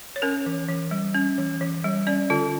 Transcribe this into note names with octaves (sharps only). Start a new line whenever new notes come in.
C#5
C#4 A#4
E3
E3
G3
C#4
E3
E3
G3
C#4 D5
D3 F4